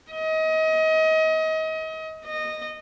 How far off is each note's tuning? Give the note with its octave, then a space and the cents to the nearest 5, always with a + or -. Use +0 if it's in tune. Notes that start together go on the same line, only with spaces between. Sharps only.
D#5 +30
D#5 -15